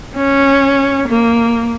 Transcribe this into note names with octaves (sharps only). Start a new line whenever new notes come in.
C#4
A#3